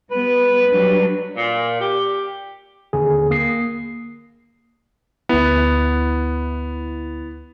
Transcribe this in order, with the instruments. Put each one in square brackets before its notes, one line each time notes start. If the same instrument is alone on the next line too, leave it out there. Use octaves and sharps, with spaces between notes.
[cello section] G3 B3 [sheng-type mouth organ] B4
[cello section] F#3 G3 D4
[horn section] A#2
G4
[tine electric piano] D#2 D3 G#4
A#3 D#6 C7
[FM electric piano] D2 E4 [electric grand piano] B3